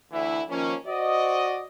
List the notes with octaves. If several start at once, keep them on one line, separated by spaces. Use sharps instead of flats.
D2 E3 E4
D#3 F3 A#3 C#4
F#4 C5 D5 D#5